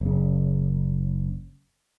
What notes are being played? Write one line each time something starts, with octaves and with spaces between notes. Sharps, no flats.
F#1 C#3